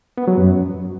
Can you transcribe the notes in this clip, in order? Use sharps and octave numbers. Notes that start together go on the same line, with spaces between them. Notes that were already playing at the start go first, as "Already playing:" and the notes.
B3
F#3
F#2